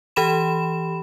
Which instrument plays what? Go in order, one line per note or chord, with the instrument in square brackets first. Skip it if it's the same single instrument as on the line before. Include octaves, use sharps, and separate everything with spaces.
[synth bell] E3 G4 B5 E7